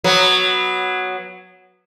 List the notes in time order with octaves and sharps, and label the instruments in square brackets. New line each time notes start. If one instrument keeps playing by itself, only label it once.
[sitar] F#3 B3